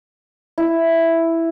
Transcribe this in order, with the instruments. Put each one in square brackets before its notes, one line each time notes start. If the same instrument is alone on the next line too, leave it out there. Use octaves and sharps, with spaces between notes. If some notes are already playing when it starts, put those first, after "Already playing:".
[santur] E4